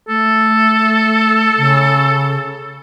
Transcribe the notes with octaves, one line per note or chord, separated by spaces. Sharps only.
A3 A4
C#3